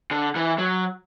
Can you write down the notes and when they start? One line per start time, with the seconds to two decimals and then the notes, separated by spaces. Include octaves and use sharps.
0.11 D3
0.36 E3
0.58 F#3